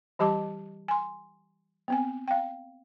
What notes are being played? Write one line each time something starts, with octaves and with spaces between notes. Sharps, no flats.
E3 G3 G4 D#5 A5 D6
G#5 C6
B3 C4 G#5
F5 G5